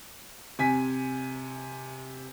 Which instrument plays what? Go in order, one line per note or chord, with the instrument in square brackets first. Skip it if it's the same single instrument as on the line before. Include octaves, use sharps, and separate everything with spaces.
[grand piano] C3 G#5 B6